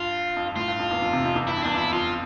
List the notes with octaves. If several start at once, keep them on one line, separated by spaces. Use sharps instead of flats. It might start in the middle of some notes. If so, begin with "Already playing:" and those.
Already playing: G2 F4
F2
G2
A2 F4
G2
F2
E2
F2
C3
F2
E2
G2 E4
F2
E2 D4
F2 E4
F2 F4